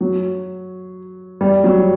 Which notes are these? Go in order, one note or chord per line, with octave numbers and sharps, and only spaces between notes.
F#3
G3
F#3